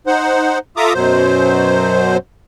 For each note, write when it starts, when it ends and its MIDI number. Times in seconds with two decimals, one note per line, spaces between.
0.07 0.59 63
0.07 0.59 72
0.07 0.59 78
0.77 0.93 65
0.77 0.93 69
0.77 0.93 76
0.77 0.93 82
0.77 0.93 86
0.77 0.93 87
0.94 2.17 42
0.94 2.17 47
0.94 2.17 54
0.94 2.17 72